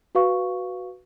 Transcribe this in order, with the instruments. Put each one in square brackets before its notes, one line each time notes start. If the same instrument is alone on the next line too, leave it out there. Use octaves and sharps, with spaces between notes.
[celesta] F#4 B4 F5 C#6